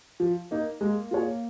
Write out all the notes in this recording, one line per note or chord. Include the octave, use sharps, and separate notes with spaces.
F3
A#3 D#4
G#3 A#3
F4 G#4 C#5